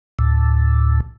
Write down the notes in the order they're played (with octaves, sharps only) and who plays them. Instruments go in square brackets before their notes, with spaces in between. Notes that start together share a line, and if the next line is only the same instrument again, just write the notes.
[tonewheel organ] D2 A2